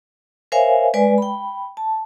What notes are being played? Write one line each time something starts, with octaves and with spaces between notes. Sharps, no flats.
A#4 C5 C#5 E5 F5 G#5
G#3 B4 D5 G#5
G5 B5
A5